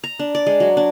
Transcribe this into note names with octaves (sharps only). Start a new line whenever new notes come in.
A#5
D4
D5
G#3
F#3
D4